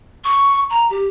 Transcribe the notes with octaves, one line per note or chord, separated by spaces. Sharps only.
C#6
A#5
G4